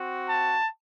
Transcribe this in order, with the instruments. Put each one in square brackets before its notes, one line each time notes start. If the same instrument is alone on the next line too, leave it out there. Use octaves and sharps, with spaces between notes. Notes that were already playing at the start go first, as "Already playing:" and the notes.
Already playing: [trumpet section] C4 F#4
A5